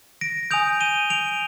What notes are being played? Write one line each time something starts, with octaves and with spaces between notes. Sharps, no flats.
A#6 D7
G#5 D#6 G6 D7 F7
D#7 G7
D7 F7